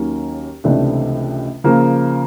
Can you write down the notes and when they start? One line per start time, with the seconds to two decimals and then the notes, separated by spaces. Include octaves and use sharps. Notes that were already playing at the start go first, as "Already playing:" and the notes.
Already playing: D#2 D#3 F#3 A#3 C#4
0.64 C#2 C3 E3 A3 D4
1.64 C#3 F3 A#3